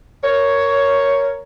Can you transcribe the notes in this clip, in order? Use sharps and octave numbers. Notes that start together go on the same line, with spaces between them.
A#4 C#5